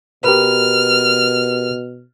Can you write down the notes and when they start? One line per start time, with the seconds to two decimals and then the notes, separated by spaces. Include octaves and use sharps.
0.24 B2 G4 A#4 B4 F6